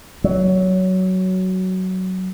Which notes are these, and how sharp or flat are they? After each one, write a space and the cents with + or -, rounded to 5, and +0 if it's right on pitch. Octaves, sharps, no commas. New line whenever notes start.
F#3 +10